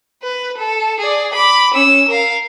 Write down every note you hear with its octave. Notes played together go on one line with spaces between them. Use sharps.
B4
A4
G#4 D5
B5 D6
C#4 E6
A#4 F5